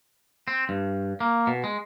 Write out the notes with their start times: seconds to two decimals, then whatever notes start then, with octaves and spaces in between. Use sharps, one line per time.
0.48 C4
0.69 G2
1.20 A#3
1.47 B2
1.64 G#3